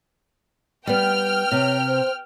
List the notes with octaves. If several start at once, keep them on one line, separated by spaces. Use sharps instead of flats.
G3 B3 G5 F6
C3 C#5
C5